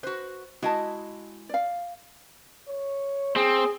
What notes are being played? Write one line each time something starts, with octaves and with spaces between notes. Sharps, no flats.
F#4 B4 C5
G#3 E4 F#4 D#5 A5
D5 F5
C#5
C4 G#4